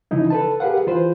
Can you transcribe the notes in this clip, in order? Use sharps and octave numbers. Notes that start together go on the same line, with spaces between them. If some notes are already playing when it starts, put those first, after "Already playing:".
C#3 E3 F3 D#4 E4
A4 B4 A5
G4 G#4 A#4 B4 F5 F#5
E3 F4 B4 C5